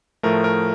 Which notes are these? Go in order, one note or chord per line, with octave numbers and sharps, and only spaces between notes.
A2 F3 A3 A#4
A#4